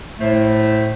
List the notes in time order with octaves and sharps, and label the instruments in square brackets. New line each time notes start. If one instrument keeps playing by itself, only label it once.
[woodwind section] A2 A3 C5